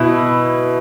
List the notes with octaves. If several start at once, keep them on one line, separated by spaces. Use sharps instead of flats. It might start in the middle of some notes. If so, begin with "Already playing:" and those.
Already playing: B2 E4